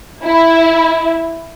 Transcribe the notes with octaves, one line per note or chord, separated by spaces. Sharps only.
E4